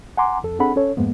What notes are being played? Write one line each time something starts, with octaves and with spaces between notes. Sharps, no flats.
F#5 G#5 A#5 C6 D6
F2 A4
C4 D4 G#4 A4 F#5 B5
C#4 A4 C#5
F2 G#2 G#3 A#3 B3